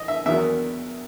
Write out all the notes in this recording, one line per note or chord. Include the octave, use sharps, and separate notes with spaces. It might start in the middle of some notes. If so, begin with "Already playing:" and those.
Already playing: D#5
E5
E2 D#3 F#3 A#3 E5